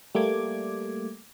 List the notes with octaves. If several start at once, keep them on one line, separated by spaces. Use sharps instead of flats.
G3 A3 A#3 D6 G#6